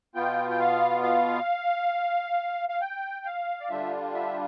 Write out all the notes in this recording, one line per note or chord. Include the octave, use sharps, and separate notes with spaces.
B2 B3 F4 G5
G5
F5
F5
F5
G5
F5
D5
D3 G3 D4 F4 E5
E5